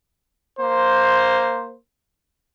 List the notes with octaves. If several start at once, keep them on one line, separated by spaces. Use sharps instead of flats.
A#3 C5